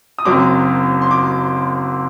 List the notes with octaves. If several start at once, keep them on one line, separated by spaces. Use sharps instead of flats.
D#6
F#1 F#2 F#3 C4 D6
C6
D6